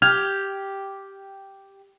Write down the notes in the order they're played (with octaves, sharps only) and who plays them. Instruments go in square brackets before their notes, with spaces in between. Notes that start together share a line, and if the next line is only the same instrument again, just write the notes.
[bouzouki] G4 [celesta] F6 G#6 F7